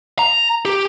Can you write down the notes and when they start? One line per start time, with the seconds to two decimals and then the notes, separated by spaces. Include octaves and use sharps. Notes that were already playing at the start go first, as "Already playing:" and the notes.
0.19 A#5
0.65 G4